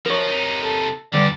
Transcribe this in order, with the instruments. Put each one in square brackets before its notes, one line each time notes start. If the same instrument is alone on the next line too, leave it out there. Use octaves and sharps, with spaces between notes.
[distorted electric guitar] F3 [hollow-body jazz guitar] A#4 C#5
[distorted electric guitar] C3 D#4
[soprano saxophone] A4
[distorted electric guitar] E2 [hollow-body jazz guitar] D3 G3 [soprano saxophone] D5